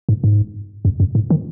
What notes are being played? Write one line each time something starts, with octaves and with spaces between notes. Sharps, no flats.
G#2
G#2
F#2
F#2
G#2
D#3